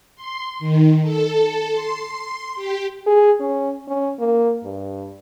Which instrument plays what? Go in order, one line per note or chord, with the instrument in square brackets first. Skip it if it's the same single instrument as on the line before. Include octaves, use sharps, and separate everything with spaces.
[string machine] C6
D#3
A4
C6
G4
[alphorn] G#4
C#4
C#4
A#3
G2